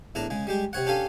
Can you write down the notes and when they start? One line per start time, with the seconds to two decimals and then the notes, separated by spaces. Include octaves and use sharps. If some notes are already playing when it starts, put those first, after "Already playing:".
0.15 E2 A2 D4 A5 A#5
0.30 C#3 G#3
0.47 G3 G#3 G4
0.73 C3 C4 C#5 F#5
0.86 C#4 D4 G4 A4 F5 G#5